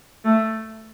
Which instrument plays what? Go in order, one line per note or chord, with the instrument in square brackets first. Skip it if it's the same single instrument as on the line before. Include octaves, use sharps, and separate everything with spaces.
[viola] A3